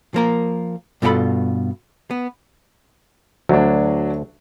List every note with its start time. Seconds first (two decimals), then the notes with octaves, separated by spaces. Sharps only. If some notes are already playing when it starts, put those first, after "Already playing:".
0.14 F3 A#3 A#4
1.02 G2 B2 F4 G4 A4 B5
2.11 B3
3.49 D2 F#3 D4